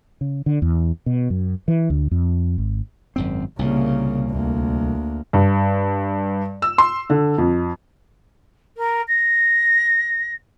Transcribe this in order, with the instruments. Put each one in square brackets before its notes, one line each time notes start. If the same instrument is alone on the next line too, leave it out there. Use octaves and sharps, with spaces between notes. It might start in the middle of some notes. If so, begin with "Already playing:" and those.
[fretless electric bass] C#3
D3
E2
B2
F#2
E3
D2
F2
G#1
[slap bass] G#1 F#2 C4
[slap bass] C2 A#2 [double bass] C#3 A#3
[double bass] D2 A#3
[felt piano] G2
E6
C6
D3
F2
[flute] A#4
A#6